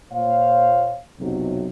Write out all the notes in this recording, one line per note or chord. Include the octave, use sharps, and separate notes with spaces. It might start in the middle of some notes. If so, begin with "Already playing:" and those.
A#2 C5 C#5 F5
B1 F2 C3 F#3